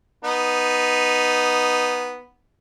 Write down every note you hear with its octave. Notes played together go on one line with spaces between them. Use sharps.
B3 D#4